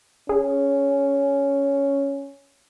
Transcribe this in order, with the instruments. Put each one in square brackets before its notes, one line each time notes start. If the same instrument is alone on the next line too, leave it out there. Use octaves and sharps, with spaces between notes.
[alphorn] C#4 [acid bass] G#4